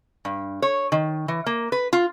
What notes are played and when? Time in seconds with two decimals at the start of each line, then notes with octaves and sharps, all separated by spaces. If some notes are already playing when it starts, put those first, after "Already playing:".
0.25 G2
0.62 C#5
0.92 D#3
1.28 E3
1.46 A#3
1.72 B4
1.93 F4